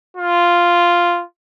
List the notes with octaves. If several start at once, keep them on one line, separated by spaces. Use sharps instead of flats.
F4